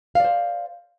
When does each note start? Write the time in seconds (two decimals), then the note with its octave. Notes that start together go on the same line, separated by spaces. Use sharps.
0.15 F5
0.20 D5
0.24 C5